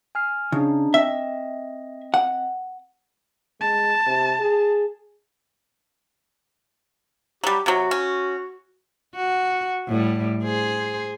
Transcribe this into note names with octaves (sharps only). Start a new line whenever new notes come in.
G#5 F6 C7
C#3 D4 D#4
C4 D#5 E5
F#5
G#3 A5
C3
G#4
F#3 G3 G4
C3 F#3 F#4
C#4
F#4
A2 G3
G#4 C5